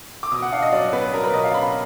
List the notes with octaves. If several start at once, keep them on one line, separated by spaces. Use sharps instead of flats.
D6
B2 D#6
F#5
D4 F5
D#5
F#3 D5
B3 B4
F#3 A#4
B4
B2 D#5
F5
D4 B5